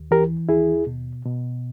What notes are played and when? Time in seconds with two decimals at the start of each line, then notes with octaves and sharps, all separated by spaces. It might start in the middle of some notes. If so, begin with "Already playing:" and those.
Already playing: D#2
0.11 E3 G4 A#4
0.49 D#2 E4 G#4
0.87 B2
1.25 B2